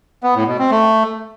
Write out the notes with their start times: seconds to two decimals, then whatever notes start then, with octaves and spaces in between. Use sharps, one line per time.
0.23 B3
0.35 A2
0.47 B2
0.59 C4
0.71 A3